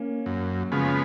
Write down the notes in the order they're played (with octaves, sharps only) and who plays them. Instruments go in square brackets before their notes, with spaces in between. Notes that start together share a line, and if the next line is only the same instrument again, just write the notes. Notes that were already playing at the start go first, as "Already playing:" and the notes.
Already playing: [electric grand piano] A#3 C#4
[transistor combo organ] F#2
C#3 F3 G#3 B3